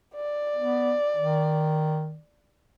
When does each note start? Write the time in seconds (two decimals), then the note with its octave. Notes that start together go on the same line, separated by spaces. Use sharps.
0.15 D5
0.56 B3
1.16 D#3